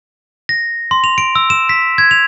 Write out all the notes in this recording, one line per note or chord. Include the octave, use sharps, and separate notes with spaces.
A#6
C6
F7
D7
E6
E7
B6
G#6
F7